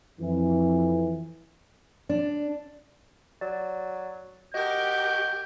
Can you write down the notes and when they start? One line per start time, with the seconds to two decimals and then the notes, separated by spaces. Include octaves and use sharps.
0.20 F2 E3
2.09 D4
3.41 F#3 D5
4.54 F#4 G4 A#4 D#5 G6